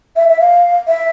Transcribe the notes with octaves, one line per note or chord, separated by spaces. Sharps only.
E5
E5
F5
E5